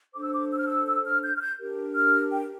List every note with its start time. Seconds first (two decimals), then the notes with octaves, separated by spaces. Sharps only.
0.14 D4 A4 C5 D6
0.23 E6
0.32 D6
0.51 E6
0.58 F6
0.66 E6
0.87 E6
1.05 F6
1.23 G6
1.35 F6
1.41 G6
1.59 D4 G4 A#4
1.95 F6
2.32 G5